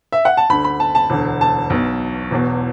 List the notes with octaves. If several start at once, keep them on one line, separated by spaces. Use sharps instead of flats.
E5
F#5
A5
D2 D3 B5
B5
A5
A5
E1 D2 D3
A5
B1 B2
E1 E2 B2